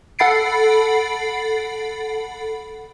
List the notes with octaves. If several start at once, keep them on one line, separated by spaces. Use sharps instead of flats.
A4 F#5 B5 A6 C7 D7